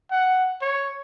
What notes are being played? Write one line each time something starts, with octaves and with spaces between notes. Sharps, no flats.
F#5
C#5